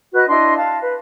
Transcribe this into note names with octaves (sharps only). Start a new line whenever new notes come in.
F#4 B4 D#5 F#6
D4 E4 D#5 C6
F5 A5
B4